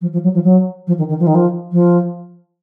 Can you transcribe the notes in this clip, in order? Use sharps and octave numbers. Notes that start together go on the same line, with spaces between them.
F3
F3
F#3
F3
F#3
F3
D#3
D#3
F3
D#3
F3
F3